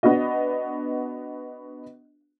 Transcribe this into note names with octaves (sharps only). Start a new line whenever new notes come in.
B3 D4 F#4 D#5